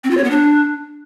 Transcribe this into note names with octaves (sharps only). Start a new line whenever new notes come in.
C4
F4
C#5
B3
D4